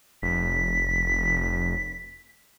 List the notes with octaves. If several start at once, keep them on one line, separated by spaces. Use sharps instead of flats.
F1 B6